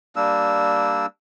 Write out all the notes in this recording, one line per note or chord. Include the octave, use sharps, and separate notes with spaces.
G3 A#3 D4 E6